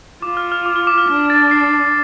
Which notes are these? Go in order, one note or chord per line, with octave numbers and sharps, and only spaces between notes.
F4 D6
F6
F6
D6
F6
D6
F6
D4 F6
A6
C7